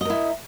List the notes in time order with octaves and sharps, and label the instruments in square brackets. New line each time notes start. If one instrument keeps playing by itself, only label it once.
[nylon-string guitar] D#5
A#4
E4